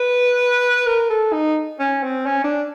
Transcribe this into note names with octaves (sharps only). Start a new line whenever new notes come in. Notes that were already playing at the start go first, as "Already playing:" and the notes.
Already playing: B4
A#4
A4
D#4
C#4
C4
C#4
D4